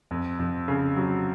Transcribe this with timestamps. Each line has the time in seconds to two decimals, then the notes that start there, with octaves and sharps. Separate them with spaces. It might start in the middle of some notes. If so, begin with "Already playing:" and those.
0.11 F2
0.39 F2
0.68 C#3
0.96 F#3